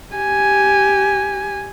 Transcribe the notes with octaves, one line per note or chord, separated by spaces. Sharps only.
G4 G#5